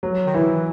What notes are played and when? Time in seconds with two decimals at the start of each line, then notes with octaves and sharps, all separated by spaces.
0.03 F#3
0.26 D#3
0.35 E3 E4